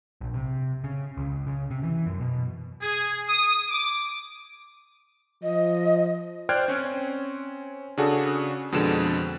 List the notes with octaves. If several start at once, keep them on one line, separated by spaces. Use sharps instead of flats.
A#1
C3
C#3
C#2
C#3
C3
E3
F#2
B2
G#4
D#6
D6
F3 D#5
C5 D5 G5 F6 F#6 G#6
C4 C#4
C#3 D4 F#4 G#4 A4
F2 B2 D3 G#3 E7